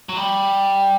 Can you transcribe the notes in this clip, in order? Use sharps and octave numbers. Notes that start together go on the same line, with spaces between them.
F#3
G3